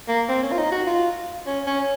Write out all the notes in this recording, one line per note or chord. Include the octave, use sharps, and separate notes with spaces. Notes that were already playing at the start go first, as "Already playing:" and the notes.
A#3
C4
C#4
F4
D#4
F#4
F4
C#4
C#4